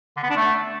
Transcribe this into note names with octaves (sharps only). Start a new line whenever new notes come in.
D3
B3
D4
A3